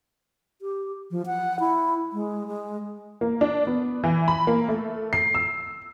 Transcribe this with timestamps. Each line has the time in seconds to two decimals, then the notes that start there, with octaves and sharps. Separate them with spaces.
0.62 G4
1.11 F3
1.26 F#5
1.60 E4
2.13 G#3
2.48 G#3
3.21 A#3
3.41 D4
3.67 B3
4.04 E3
4.28 B5
4.47 A#3
4.69 A3
5.13 C7
5.35 E6